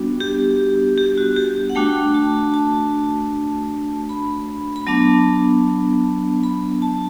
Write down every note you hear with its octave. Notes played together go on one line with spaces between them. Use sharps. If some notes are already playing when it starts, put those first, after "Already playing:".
Already playing: G3 B3 D4 F#4
G4
G4
F#4
G4
F#5
A3 D4 F#4 G5
A5
A5
B5
B5
F#3 B3 D4 A5
B5
A5